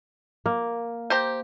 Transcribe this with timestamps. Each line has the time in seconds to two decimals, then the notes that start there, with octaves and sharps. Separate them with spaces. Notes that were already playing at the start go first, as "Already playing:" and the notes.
0.46 A#3
1.10 G4 C5 A#5